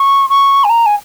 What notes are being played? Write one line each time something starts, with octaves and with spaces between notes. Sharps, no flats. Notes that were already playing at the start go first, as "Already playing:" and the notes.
Already playing: C#6
C#6
G#5
A#5
G#5